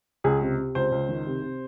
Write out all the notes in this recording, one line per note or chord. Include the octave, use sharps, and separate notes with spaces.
C#2 G#4
C3
C3
C#2 C5
C#2
D#3
C3
C3